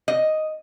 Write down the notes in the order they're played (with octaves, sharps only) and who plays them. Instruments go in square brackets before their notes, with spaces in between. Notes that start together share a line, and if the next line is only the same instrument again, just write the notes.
[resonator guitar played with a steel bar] D#5